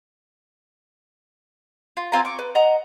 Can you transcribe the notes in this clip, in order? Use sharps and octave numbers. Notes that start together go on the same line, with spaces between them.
F4
C4 F4 G#5 A#5
C#6 D6
B4
D#5 F#5 A#5